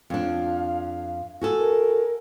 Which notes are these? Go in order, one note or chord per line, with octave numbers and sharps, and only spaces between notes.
F2 D4 F5
F#4 G#4 A4
A#4